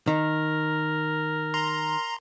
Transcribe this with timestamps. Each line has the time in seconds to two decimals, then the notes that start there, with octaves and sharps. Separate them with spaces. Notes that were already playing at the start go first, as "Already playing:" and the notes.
0.07 D#3 A#4
1.54 A#5 C6